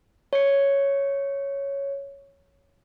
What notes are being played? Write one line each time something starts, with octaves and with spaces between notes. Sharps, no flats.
C#5 C#7